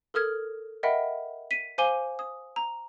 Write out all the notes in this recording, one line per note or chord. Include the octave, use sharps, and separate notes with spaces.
A4 A#4 D#6 F6 G#6
A#4 D#5 E5 F#5 G5 B5
B6 D#7
C5 F5 G#5 D6 D#7 G7
D#6
A#5